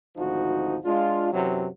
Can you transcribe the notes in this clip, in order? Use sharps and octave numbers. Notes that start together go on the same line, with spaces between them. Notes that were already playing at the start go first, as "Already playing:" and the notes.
G#1 D2 F3 D#4 F#4
G#3 D4 F4
F#2 C3 E3 F#3